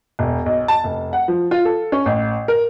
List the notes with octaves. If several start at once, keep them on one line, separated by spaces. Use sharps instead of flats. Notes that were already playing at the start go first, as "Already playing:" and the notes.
E1
B1
A5
F1
F#5
F3
F4
A4
C#4
A1
A#4